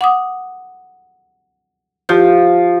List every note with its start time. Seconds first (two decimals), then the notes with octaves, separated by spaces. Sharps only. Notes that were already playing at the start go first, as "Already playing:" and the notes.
0.01 F#5 D6 D#6
2.09 F3 F4 G4 G6